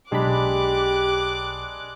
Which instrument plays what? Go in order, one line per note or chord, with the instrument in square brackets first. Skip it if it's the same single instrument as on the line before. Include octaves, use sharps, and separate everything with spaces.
[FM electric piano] B1 B5 [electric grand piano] G#3 D4 [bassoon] G4 [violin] D6 F#6